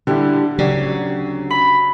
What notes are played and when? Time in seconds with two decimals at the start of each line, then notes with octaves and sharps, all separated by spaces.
0.07 D3 G3 D4 E4 G4
0.58 D2 C#3 F#3 D4 G4
1.50 B5